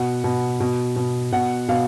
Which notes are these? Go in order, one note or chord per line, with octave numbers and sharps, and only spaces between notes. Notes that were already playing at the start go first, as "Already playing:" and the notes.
Already playing: B2 F#5
B2
B2
B2
B2 F#5
B2 F5